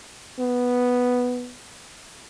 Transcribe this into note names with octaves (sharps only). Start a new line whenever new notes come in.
B3